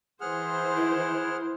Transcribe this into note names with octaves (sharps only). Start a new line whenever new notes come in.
E3 G#4 C5 F#5 F6
E4